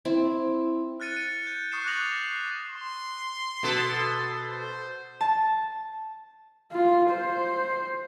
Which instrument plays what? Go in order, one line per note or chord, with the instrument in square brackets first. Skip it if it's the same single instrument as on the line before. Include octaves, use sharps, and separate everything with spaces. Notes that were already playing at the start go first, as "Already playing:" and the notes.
[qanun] C4 E4
[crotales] F6 F#6 A6 C#7 D#7
D#7
G6
C#6 D#6 F#6 C7 C#7 E7
D6 F#6 A6 A#6 F7 F#7
C7
[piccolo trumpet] C6
[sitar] B2 A4
[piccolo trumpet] C5
[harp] A5
[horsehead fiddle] F4
C5